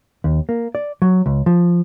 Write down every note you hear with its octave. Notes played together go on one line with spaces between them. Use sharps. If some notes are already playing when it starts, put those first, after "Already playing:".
D#2
A#3
D5
F#3
C#2
F3